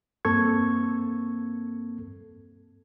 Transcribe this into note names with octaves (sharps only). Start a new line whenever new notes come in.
G2 A#3 C4 A4 C#6 G#6